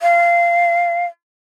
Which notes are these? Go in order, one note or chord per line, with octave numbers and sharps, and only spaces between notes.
F5